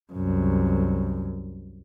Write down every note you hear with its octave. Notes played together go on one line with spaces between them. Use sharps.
C2 F#2